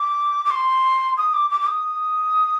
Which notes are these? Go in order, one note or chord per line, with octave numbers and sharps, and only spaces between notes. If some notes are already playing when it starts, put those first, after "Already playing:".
Already playing: D6
D6
C6
D#6
D6
D6
D6
D#6